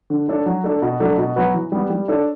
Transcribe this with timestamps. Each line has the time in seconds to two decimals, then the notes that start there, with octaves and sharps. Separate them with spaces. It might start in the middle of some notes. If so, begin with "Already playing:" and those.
0.10 D3
0.28 A3 D4 A4 C#5
0.46 F#3
0.64 A3 D4 A4
0.82 B2
1.00 F#3 A3 D4
1.18 B2
1.36 F#3 B3 F#4 B4
1.54 E3
1.72 G3 B3
1.90 G3
2.08 D4 A4 C#5